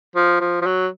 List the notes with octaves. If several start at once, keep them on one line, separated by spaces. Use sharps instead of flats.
F3
F3
F3
F#3